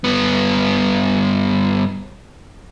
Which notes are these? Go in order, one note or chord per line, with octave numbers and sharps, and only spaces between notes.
G2 B3